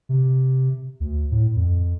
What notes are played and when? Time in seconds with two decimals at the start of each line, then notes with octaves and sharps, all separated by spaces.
0.09 C3
1.00 D2
1.31 A2
1.56 F2